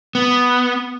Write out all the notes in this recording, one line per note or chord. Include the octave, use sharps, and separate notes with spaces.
B3